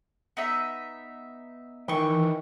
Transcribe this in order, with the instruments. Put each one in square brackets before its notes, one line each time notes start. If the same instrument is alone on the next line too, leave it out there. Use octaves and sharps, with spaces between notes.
[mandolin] B3 D#4 E5
[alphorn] D#3 [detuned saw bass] E3 [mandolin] G5 C#6